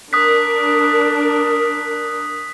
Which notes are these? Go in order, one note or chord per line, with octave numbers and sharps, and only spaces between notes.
D4 A#4 D#6 F#6 B6